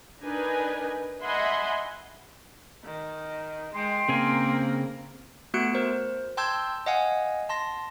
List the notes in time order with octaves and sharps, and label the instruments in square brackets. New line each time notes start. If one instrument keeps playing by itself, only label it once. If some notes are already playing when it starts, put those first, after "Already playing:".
[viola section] D4 D#4 A#4 B4 G#5
D#5 E5 F#5 G#5 B5 C6
[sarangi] D#3
[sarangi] G#3 [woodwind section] G5 C6
[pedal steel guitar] C#3 C4 G#5 [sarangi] A#3
[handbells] A3 B3 F#4 F#6 C#7 D7
A#4 C5
G5 A5 C6 E6 G6 G#6
D#5 F5 F#5 G#5
A5 C6 A#6